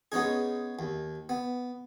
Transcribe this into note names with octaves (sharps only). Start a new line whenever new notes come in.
G#3 B3 C#4 D#4 G#4
D#2
B3